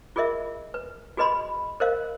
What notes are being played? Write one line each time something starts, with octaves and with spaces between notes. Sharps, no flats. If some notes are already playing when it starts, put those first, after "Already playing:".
F4 G#4 A#4 D#5 E5
B4
F#4 G#4 B4 D#5 B5 C6
A#4 C5 D#5 F5